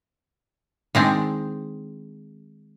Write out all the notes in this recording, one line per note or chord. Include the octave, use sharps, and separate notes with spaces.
D#3 G#3 C4 D4